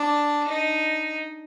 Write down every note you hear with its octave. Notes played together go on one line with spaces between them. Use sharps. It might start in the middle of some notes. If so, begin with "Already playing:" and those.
Already playing: D4
D#4